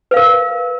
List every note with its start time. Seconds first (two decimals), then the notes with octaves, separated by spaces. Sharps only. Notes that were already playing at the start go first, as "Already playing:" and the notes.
0.11 B4
0.14 F5
0.16 A#4